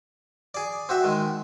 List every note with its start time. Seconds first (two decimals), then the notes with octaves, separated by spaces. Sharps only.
0.54 G#4 D5
0.89 C4 F#4 E5
1.04 D#3 G#3